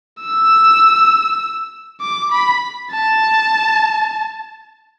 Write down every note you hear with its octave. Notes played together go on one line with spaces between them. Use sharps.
E6
D6
B5
A5